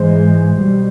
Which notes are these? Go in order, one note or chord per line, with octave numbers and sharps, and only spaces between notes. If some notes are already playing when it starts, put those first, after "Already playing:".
Already playing: G#2 E3 G#3 C5
B1 B2 G3